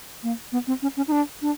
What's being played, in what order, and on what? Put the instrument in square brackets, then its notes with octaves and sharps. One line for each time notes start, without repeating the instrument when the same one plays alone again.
[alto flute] A#3
B3
C4
C#4
C#4
D#4
D4
D4